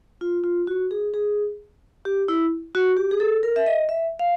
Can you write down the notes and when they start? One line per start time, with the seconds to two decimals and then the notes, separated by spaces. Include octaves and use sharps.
0.21 F4
0.44 F4
0.67 F#4
0.91 G#4
1.14 G#4
2.05 G4
2.28 E4
2.75 F#4
2.97 G4
3.11 G#4
3.20 A4
3.43 A#4
3.56 E5
3.66 D#5
3.89 E5
4.19 F5